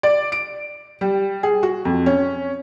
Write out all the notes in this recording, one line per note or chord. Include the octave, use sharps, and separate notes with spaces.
D5
D7
G3
G#4
F#4
F2
C#4